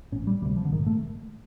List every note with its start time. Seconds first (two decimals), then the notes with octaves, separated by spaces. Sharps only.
0.12 A1 A2 C#4
0.27 G3
0.42 D2 G3
0.45 C3
0.57 F3
0.65 D3
0.72 A#1 G#2 D#3
0.87 A3